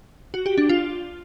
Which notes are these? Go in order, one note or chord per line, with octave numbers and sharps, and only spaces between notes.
F#4
G4
D4
F4